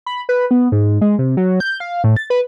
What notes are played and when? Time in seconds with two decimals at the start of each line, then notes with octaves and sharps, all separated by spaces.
0.06 B5
0.29 B4
0.51 B3
0.72 G#2
1.01 G#3
1.19 C3
1.37 F#3
1.60 G6
1.80 F5
2.04 A2
2.16 A6
2.30 B4